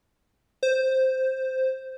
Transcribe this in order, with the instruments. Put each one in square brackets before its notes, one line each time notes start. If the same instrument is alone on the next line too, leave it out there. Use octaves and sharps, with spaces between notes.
[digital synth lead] C5